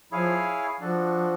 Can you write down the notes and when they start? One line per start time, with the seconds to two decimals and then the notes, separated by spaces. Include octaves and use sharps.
0.12 F3 E4 G#4 C#5 F5 G#5
0.80 F3 D4 F#4 A4